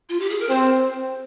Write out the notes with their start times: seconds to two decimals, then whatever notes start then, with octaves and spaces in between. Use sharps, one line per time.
0.09 F4
0.20 G4
0.30 G#4
0.40 A#4
0.49 C4 C5